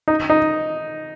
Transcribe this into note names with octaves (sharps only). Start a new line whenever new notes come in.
D#4
D#4